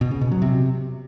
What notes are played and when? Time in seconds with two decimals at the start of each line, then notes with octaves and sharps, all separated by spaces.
0.01 B2
0.11 C#3
0.21 B2
0.32 F#3
0.42 C3